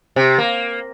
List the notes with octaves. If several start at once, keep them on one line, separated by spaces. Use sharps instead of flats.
C3
A#3